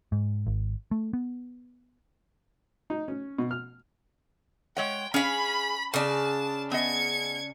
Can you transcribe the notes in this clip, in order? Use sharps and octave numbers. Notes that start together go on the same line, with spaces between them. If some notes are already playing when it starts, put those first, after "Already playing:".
G#2
G#1
A3
B3
D#4
C#4
B2
F6
G#3 C#5 F#5 G5
C#4 G#4 F5 B5
C#3 D4 A5
B3 D#5 G#6 C#7